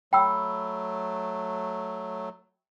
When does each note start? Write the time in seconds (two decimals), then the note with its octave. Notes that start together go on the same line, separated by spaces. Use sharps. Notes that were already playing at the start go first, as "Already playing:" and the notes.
0.13 F#3 A3 G5 B5 E6